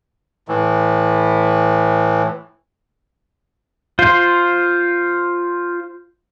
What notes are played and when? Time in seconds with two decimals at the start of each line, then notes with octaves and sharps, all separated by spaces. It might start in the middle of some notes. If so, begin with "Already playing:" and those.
0.48 A2 E3
3.99 F4 C5